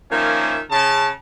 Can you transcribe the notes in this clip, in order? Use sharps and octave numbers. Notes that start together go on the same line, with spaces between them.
D#3 F3 A#3 C#4 E5 G#5
C#3 A5